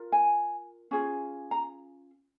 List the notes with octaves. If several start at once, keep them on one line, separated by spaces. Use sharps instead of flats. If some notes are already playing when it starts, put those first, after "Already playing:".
Already playing: F4 A#4
G#5
C#4 F4 G#4
A#5